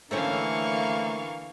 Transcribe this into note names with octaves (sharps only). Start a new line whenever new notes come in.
D3 E3 A3 A#3 C4 C#4 F5 C#6